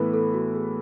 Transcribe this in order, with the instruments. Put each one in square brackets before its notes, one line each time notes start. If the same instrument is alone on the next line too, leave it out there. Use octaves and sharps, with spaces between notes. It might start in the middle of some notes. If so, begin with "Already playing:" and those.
Already playing: [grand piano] A2 E3 B3 [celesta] A4 B4
[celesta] A4
F#4
G#4